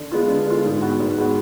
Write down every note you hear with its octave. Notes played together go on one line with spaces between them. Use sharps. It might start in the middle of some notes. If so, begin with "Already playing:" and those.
Already playing: D3
G#3 B3 F4
D3
G#3 B3 F4
G#2
G#3 B3 F#4
G#2
G#3 B3 F#4